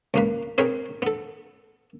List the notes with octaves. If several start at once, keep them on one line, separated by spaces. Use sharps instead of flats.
C#2 A#3 B4
C4 G#4 A#4 B4 C#5 G5
B3 A4